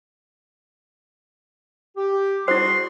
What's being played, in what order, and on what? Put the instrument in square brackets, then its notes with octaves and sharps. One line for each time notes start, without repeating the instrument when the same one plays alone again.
[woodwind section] G4
[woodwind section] G3 F#4 G#4 [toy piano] E4 C5 [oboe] C6